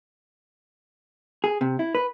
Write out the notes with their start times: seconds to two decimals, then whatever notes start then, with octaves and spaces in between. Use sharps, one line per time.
1.44 G#4
1.61 C3
1.79 E4
1.95 B4